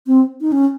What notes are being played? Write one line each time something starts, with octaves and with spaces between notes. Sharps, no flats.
C4
D#4
C#4